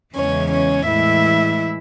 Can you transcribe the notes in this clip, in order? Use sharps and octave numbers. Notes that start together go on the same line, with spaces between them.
E2 C#3 E3 G#3 C#4 C#5
C#4 C#5
A2 E3 G#3 E4 E5